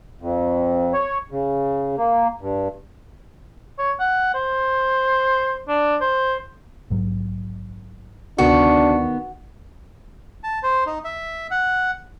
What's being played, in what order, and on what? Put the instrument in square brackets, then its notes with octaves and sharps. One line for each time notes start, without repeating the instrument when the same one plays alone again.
[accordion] F2
C#5
C#3
A#3
G2
[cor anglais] C#5
F#5
C5
D4
C5
[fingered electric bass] A#1 G#2 F#3
[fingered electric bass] D2 C3 [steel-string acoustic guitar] D#3 B3 [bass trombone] D4 [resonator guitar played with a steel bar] F#4
[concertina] A5
C5
D#4
E5
F#5